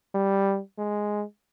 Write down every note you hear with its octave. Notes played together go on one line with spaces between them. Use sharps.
G3
G#3